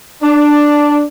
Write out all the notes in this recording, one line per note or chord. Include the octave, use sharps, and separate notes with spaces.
D4